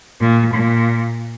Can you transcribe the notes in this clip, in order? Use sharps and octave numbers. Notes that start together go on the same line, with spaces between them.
A#2
A#2